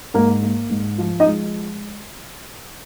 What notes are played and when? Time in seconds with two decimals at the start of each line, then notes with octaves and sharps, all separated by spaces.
0.14 G#2 A#3 A#4
0.42 A#3
0.70 G#2
0.98 F3
1.20 D#4 D#5
1.27 G#3